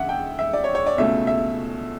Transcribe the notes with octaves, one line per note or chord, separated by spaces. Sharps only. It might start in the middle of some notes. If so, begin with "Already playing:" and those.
Already playing: E2 C#3 E5 F#5
G5
E5
D5
C#5
C#5
D5
C#2 B2 A3 C#4 E5
E5